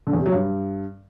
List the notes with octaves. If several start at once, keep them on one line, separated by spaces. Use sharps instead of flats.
D3
E2
C3
F#3
G2